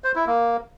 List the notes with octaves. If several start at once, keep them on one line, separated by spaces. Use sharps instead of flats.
C5
E4
A#3